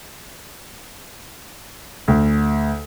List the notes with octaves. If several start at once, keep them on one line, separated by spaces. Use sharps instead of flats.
D2